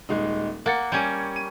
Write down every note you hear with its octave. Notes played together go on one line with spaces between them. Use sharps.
D#1 G#3 D#4
A#3 F#5 A6 C#7
G3 C#4 G6 G#6 D#7
D#7